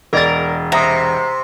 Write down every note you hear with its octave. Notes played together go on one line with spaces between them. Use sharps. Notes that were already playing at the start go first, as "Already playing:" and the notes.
E1 G#4 A#4 D5 D#5 A6
C3 E5 A#5 D#6